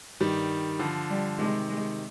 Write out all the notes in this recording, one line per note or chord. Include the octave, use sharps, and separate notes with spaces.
G2 D#3 G3
D3 F3
G3
C3 D#3 G#3
G#3